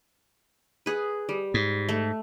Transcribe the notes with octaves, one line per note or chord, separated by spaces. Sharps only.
G#4 B4
G3
G#2
A3